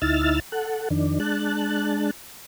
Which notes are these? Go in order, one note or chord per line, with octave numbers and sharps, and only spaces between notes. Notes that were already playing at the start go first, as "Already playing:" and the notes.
D2 D#4 E4 E6 F6 A6
A4 F#5
F2 D#3 D4
G#3 D4 A5 F#6